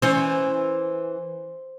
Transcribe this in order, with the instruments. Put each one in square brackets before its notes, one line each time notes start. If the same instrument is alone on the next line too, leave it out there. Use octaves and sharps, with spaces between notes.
[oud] E3 C#4 [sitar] C5